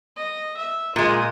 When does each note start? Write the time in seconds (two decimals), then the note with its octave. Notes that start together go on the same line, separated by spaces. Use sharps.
0.17 D#5
0.58 E5
0.96 A#2 G#3 F4 D#6